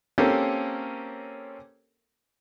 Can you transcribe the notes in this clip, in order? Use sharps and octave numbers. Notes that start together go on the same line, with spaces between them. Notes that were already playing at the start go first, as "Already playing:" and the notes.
A#3 C4 C#4 G4 A4 A#4